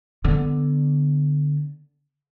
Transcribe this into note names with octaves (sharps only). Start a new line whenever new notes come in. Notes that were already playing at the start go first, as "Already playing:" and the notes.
D3 B3